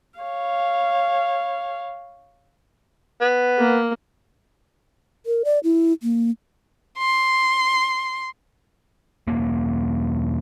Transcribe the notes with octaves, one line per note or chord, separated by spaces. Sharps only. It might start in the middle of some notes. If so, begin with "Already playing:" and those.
C#5 F5
B3
A#3
A#4
D5
E4
A#3
C6
E1 A#3